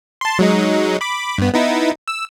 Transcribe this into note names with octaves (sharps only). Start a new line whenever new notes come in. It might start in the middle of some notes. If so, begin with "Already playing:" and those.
A5 C6
F#3 G#3 D#4
B5 D6
G2 B3
B3 D#4 E4
E6